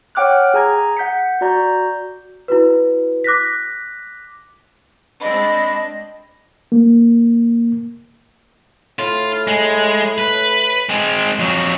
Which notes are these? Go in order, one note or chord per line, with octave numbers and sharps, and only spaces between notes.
C#5 F#5 G5 D6 F6 F#6
G#4 G#5 A#5 G#6
F#5 G6 B6 C#7
F#4 D5 A#5 G6
E4 F#4 B4
D6 F#6 A#6 B6
G#3 C4 D4 D#5 B5
A#3
A2 F4
G#3
B4
G#3 C4
F2 F#3